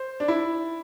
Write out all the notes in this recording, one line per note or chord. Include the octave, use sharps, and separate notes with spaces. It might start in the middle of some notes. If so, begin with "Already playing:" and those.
Already playing: C5
D4
E4